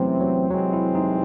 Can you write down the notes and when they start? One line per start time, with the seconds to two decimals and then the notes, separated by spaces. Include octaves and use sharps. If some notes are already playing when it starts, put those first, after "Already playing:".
Already playing: C3 E3 F#3 A3 C4 C#4
0.20 F#3
0.50 C2 C3 E3 F#3 G#3 C4
0.73 E4
0.95 D#4